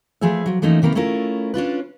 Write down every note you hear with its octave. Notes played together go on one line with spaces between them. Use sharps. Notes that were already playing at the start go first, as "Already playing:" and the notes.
F3 A3 G#4 B4 E5
F3 F#3
E3 F3 A3 A#3 C#4 D#4
C3 D#3 A#3 A#4 B4
A3 C#4 E4 F4 A#4
C#4 D4 F4 B4